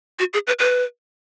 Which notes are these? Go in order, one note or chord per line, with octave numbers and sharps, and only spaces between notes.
F#4
G#4
B4
B4